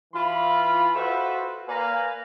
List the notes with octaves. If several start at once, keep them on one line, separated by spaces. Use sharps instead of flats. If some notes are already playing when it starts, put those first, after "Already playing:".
E3 F4 B5
F4 F#4 A4 B4 C5 E5
A#3 B4 D5 F5 G#5 A#5